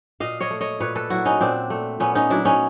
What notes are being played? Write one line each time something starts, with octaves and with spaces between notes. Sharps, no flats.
A#2 D#5 F5
C#5 D#5
A3
C#5 D#5
A#2 B4 C#5
A4 B4
F#3 E4 F#4
C#4 D#4
A#2 C4 D4
A3
A#2 B3 C#4
C#4 D#4
F#3 D4 E4
C#4 D#4